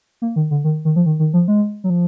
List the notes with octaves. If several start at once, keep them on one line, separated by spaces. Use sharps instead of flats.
A#3
D#3
D3
D#3
D#3
F3
D#3
D#3
F3
G#3
F#3
F3